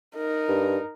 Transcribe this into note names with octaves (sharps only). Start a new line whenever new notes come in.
D#4 A#4
G2